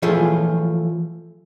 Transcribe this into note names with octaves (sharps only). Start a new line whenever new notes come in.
E3 F3 A3 F4 G#4